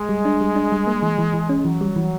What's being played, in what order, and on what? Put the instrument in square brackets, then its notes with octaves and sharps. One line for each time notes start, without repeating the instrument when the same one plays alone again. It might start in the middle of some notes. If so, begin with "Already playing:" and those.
Already playing: [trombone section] G#3
[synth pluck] G3
D4
G3
D4
G3
A#3
E3
E3
E3
C#4
[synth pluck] E3 [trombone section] F#3
[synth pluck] G3
E3